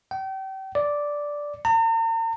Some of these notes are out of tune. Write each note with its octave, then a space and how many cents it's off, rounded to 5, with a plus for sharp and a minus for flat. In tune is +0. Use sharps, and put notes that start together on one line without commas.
G5 -35
D5 -5
A#5 -45